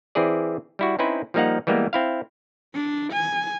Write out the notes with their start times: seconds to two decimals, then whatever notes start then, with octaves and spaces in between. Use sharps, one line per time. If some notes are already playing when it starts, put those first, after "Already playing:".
0.15 E3 C4 E4 G#4 D5
0.79 G3 E4 F#4
0.99 C4 C#4 D#4 E4 B4 C5
1.34 F3 G3 A#3 D#4 F5 F#5
1.67 E3 G3 G#3 A#3 B3
1.93 C4 E4 F5
2.75 D4
3.13 G#5